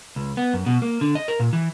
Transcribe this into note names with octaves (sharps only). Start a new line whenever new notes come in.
C#2
B3
F#2
B2
A#3
D3
D#5
A#4
A#2
E3